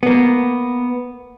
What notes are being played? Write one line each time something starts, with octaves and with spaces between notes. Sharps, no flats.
A#3 B3